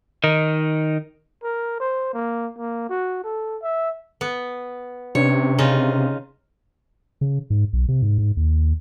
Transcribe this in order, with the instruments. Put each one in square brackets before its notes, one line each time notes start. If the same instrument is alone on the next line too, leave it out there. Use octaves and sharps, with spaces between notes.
[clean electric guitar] D#3 D#4
[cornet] A#4
C5
A#3
A#3
F#4
A4
E5
[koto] B3
[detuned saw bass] C3 [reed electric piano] C#4 D4 B4 [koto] C#5
[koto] C#3 D#4 F4
[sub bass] C#3
G#2
B1
C3
G#2
G#2
D#2